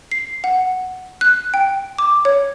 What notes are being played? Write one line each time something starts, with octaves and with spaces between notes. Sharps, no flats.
C7
F#5
F#6
G5
D6
C#5